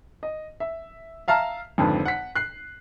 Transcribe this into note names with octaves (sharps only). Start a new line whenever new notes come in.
D#5
E5
E5 F5 A5 A#5 F6
G#1 F2 D3 B4
F#5 B6
F#6 C7